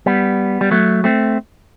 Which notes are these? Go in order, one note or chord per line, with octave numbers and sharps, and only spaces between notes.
G3 B3
G3
F#3 A3
A3 C4